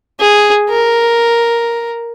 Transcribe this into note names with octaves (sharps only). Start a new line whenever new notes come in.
G#4
A#4